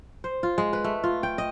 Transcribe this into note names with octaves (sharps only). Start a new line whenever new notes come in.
C5
F4
G#3
B4
A3
F4
G5
D#5